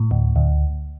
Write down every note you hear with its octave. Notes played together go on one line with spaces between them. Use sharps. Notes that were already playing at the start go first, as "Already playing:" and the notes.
Already playing: A2
D2
D2